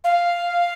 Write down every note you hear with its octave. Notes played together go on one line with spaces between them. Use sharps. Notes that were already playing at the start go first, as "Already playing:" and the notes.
F5